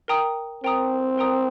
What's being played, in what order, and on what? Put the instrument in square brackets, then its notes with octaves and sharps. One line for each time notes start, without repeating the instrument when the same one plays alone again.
[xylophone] A#4 G5 A#5 D#6
[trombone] C4 [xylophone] A#4 G5 A#5 D#6
[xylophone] A#4 G5 A#5 D#6